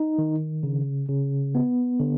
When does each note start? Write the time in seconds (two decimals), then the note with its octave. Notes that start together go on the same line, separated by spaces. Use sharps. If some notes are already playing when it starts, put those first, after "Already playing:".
Already playing: D#4
0.18 D#3
0.63 C#3
1.09 C#3
1.55 B3
2.00 D3